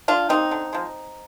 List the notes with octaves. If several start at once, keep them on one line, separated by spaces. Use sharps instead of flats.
D3 D4 F4
G3 A#3 C4 D#4
D3
F3 G#3